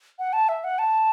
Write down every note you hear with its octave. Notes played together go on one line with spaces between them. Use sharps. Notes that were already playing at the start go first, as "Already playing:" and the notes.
F#5
A5
E5
F#5
A5